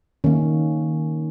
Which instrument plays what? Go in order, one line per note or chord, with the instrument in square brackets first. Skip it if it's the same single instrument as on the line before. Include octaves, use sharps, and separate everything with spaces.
[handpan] D#3 A#3 C#4